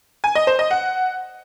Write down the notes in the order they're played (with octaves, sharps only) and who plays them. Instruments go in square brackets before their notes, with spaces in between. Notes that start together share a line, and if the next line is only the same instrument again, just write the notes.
[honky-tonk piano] G#5
D#5
C5
D#5
F#5